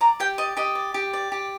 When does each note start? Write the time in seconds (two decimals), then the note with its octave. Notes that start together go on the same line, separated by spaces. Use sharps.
0.01 D5 A#5
0.20 G4 G5
0.38 D5 D#5
0.57 G4 D#5
0.75 D5
0.94 G4
1.13 D5
1.32 G4